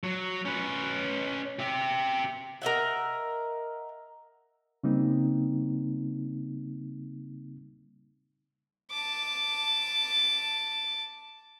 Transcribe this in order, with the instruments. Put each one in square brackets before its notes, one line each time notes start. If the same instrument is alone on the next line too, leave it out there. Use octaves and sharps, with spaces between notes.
[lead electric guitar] F#3
C#4 B4
G4 E5
[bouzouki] A#4 D#5 E5 F#5
[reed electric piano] C#3 G3 A#3 C4 D#4
[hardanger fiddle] A5 D6